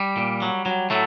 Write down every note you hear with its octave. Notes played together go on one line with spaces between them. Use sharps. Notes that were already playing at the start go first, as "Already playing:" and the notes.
Already playing: G3
A#2
F#3
F#3
A2 F#3 A3